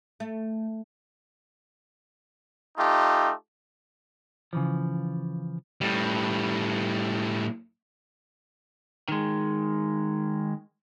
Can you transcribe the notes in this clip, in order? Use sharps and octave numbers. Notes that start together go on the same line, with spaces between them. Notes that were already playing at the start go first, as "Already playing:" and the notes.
A3
A3 D#4 F4 G4
C#3 E3 F3
A2 G3
D#3 G#3